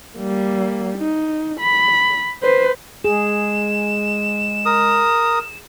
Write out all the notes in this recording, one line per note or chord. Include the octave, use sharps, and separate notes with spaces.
G3 A#3
D#4
B5
B4 C5
G#3 G#4 E7
A#4 D#6